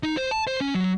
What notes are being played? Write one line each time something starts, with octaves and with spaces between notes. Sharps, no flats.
D#4
C5
A5
C5
C#4
F#3